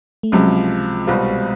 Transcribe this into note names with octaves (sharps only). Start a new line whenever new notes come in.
A3
C#2 C3 F3 F#3 G#3
C2 B2 G3 C4 F4